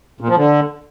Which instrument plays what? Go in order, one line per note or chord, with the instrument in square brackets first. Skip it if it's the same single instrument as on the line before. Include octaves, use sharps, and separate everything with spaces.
[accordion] A#2
F3
D3